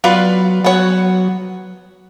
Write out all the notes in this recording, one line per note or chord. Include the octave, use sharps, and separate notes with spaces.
F#3 B3 F4 B4 D5
F#3 B3 F#4 C#5